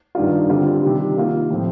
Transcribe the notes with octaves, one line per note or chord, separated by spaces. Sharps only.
G2 D#3 G3 D4 F4
D3 G3 C4 F4
C3 D#3 G3
D#3 A#3 F4
A2 F3 C4